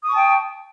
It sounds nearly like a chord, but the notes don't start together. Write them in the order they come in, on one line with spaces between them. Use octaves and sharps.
D#6 C#6 A5 G5